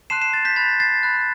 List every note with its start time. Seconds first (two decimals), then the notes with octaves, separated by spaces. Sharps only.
0.10 A5 C6 F#6 C7 E7
0.22 C7 E7
0.33 A6
0.45 G6 B6
0.56 B5 F#6 A6
0.80 A6 C7
1.03 B5 F#6